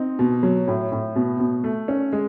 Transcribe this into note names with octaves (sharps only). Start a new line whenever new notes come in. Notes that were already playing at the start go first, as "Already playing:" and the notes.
Already playing: C4 D#4
B2
F#3
A2
A2
B2
B2
A3
C#4
G#3